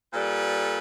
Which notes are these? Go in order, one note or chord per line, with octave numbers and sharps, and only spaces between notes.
A#2 G3 A4 B4